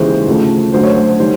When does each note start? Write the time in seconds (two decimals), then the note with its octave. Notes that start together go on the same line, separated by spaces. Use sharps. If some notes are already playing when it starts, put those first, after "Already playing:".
Already playing: D#2 C#3 E3 G#3 C5
0.27 D2 C#3 F3 A3
0.73 D2 D3 F#3 A3 C5
0.83 C#5
0.94 C5
1.20 D#3 G3 C5